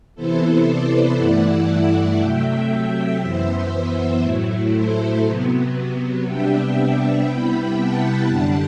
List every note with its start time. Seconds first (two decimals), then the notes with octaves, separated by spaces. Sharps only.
0.15 C3 E3 B3 E4 A4 C5
0.66 B4 D5
1.16 G2 E3 A3 E4 D5 F#5
2.18 C3 F#3 A3 E5 G5
3.20 F#2 E3 B3 C5 E5
4.22 A2 F#3 A3 E4
4.72 A4 C5
5.24 C3 F#3 B3
6.24 C3 G3 B3 D4 E5 G5
7.26 C3 G3 B3 E4 G5 B5
7.76 F#5 A5
8.28 F#2 D3 G3 D4